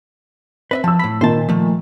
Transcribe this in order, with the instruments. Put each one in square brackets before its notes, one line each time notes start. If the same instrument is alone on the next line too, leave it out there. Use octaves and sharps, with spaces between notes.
[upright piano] C4 [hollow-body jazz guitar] B4 D#5 E5
[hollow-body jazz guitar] F3 [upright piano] A5 E6
[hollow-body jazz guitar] A2 B5
[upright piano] A#2 D#3 [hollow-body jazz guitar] C5 A5
[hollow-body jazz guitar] F3 A3